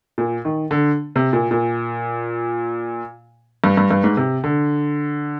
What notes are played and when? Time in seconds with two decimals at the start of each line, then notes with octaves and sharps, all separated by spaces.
0.18 A#2
0.45 D#3
0.71 D3
1.16 C3
1.33 A#2
1.51 A#2
3.64 G2
3.77 G2
3.91 G2
4.04 G#2
4.17 C3
4.44 D3